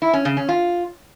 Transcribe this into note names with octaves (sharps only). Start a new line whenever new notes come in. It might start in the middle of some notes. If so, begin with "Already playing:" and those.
E4
C#4
C#3
C#4
F4